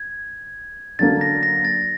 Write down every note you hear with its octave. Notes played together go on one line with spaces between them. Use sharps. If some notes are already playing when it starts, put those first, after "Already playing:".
Already playing: G#6
D3 F#3 A#3 D4 A6
A#6
A#6
A6